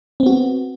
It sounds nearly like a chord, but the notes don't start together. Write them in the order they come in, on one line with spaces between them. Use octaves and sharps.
C4 B3 F#4